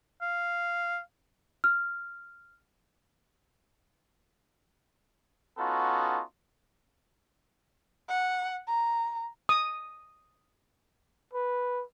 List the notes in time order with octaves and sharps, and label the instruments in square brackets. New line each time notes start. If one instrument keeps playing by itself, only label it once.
[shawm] F5
[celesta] F6
[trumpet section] B3 C#4 D#4 F4 F#4 A4
[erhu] F#5
A#5
[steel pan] D#6
[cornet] B4